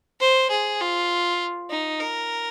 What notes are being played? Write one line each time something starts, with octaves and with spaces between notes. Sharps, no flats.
C5
G#4
F4
D#4
A#4